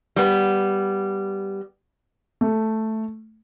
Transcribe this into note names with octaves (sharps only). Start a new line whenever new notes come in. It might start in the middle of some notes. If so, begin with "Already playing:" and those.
G3 B3
A3